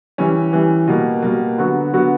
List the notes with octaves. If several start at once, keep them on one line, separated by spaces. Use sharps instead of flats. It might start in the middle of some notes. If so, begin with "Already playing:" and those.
E3 G3 C#4
E3 G3 C#4
B2 G3 A#3
B2 G3 A#3
D3 F#3 B3 F#4
D3 F#3 B3 F#4